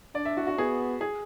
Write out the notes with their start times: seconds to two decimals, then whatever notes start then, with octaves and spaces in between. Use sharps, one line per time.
0.15 D4 D5
0.25 E5
0.37 F#4
0.47 F#4
0.58 B3 G#4
1.01 G#4